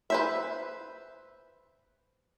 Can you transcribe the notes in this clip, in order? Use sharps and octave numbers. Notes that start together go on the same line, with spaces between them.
B4 C5 E5